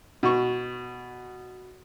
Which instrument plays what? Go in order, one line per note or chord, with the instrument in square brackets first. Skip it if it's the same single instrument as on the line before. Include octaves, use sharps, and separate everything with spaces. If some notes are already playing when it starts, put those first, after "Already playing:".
[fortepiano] B2 C#6